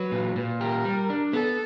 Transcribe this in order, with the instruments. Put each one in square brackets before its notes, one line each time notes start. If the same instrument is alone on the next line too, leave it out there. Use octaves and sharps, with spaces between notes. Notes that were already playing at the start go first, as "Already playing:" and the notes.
Already playing: [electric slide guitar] F#3 [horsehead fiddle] B4
[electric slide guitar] A#2
A#2
[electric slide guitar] G4 [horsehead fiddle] A#4
[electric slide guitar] G3
D4
[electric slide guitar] B3 [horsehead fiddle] A4